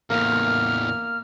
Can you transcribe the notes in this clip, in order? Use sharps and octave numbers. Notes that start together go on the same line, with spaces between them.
E2 A2 A#3 F6